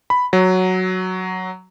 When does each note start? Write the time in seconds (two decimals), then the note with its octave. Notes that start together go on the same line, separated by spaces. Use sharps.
0.10 B5
0.33 F#3